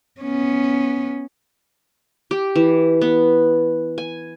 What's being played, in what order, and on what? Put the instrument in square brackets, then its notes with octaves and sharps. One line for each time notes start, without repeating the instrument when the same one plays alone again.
[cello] B3 C#4
[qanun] G4
E3
B3
G#5